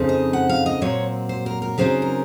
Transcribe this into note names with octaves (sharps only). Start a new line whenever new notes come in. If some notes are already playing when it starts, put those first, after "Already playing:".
Already playing: F2 C#3 C4 D#4
D#5
F#5
F5
D#5
A#2 F#3 C4 C#5
C5
A#4
A#4
C#3 F#3 C4 D#4 C5
A#4